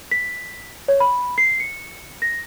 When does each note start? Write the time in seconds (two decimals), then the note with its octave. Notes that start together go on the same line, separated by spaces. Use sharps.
0.11 B6
0.88 C#5
1.00 B5
1.38 C7
1.60 C#7
2.22 A#6